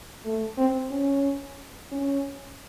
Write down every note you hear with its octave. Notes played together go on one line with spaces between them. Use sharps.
A3
C4
C#4
C#4